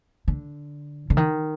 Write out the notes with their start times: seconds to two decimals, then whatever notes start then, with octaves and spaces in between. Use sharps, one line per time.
0.28 D3
1.10 D3
1.17 D#3